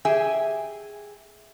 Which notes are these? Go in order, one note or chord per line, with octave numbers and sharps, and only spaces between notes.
G4 G#4 E5 G#5